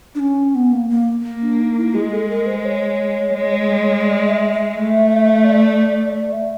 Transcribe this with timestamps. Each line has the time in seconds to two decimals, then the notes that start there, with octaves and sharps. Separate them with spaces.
0.15 D4
0.20 C#4
0.55 B3
0.72 A#3
0.90 A#3
1.24 A#3
1.42 D4
1.59 D#4
1.77 E4
1.94 G#3 G#4
2.13 A4
2.29 A#4
2.47 C5
2.65 C#5
3.35 G#3
4.05 D5
4.28 E5
4.52 E5
4.75 A3
5.44 D5
6.15 D5
6.33 E5